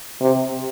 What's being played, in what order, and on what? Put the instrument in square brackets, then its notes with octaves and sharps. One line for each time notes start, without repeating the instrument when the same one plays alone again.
[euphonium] C3